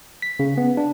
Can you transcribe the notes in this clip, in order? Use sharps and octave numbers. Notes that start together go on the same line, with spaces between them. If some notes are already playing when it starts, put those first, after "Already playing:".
B6
C#3
B3
D4